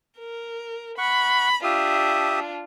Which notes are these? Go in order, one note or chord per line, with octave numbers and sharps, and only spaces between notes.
A#4
F#5 B5 C#6
D4 F4 G4 E5 D#6